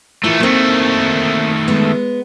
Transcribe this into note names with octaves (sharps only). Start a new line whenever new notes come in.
E3 A3 E4 F4 A#4
D#3 A3 A#3 C4
G#3 B3